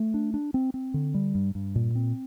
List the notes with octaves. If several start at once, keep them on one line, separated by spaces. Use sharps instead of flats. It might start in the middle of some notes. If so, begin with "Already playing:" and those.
Already playing: A3
D4
D4
C4
C4
D3
G3
G2
G2
A#2
C4